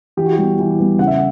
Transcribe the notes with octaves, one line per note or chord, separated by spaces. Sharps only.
E3 G4
F#4
G4
G3 B3
E3
G3 B3
C#3 F#5
E5
F#5